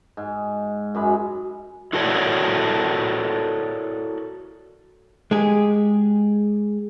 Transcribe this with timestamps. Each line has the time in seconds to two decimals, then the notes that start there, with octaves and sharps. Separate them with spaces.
0.17 G#2
0.95 F#2 G#3 B5
1.93 E4 F#4 A4 A#4 C#5 D5
5.31 G#3 G4 G#4